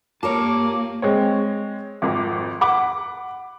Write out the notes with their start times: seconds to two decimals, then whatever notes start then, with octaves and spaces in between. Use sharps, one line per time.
0.23 A#3 F4 G4 A#4 C#5 A5 D6
1.02 G#3 C4 C#5
2.02 G#1 F2
2.61 F#5 B5 D6